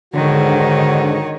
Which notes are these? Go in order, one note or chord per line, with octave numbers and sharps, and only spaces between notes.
G#2 D3 D#3 F#4 C#5